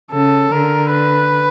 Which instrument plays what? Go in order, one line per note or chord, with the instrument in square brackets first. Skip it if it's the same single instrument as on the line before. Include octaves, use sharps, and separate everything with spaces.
[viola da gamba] C#3 [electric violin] A4
[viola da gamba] D3 [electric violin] A#4
[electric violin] B4